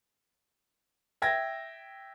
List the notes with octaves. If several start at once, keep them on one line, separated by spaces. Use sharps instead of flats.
E5 G5 G#6 A#6